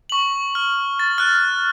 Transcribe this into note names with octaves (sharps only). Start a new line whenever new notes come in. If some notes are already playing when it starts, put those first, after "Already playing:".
C#6 F#7
F6
A6
F6 F#6